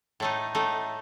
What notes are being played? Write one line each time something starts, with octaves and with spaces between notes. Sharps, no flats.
A2 A3 D#4
A2 A3 D#4